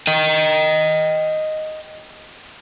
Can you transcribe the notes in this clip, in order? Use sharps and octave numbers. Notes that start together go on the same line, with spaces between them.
D#5 G5